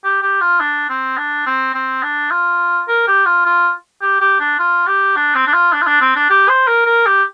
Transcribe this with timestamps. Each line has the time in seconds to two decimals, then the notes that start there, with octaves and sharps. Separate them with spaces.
0.04 G4
0.22 G4
0.41 F4
0.60 D4
0.90 C4
1.18 D4
1.46 C4
1.74 C4
2.03 D4
2.31 F4
2.88 A#4
3.08 G4
3.26 F4
3.45 F4
4.02 G4
4.20 G4
4.40 D4
4.59 F4
4.87 G4
5.16 D4
5.35 C4
5.47 D4
5.54 F4
5.73 D4
5.82 F4
5.87 D4
6.01 C4
6.16 D4
6.30 G4
6.49 C5
6.67 A#4
6.86 A#4
7.06 G4